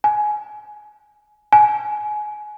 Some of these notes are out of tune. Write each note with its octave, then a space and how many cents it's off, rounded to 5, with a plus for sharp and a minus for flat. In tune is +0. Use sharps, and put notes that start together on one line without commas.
G#5 +15
G#5 +20